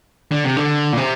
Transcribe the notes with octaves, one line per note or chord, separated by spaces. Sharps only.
D3
C3
D3
A#2
C3